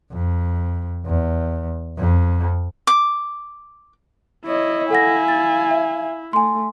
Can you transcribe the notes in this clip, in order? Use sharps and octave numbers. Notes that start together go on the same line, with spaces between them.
F2
E2
F2
D6
E4 C#5 D#5
A4 F5 F#5 G#5 A#6
A6
E5
A3 G#5 C6